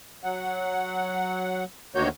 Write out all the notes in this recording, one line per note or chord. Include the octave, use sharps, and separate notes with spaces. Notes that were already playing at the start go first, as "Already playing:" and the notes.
F#3 F#5
D2 D#3 A#3 F#4 C#5 G6